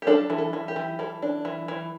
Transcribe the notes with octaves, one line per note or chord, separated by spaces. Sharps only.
G4
D4 A4
E3
A4
E3
G4
E3
E3 A4
D4
E3
E3